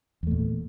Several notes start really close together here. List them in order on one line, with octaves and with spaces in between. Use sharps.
E2 A3 A#2